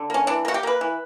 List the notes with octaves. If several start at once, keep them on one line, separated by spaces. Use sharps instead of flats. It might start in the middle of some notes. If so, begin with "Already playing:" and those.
Already playing: D3
A#3 C#4
E3 D4
A#3 F#4
G4
A#3 B4
E3